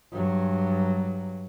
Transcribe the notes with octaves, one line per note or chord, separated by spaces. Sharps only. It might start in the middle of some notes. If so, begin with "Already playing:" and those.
G2 F#3